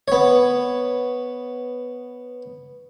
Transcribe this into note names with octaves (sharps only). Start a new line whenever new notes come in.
B3 C#5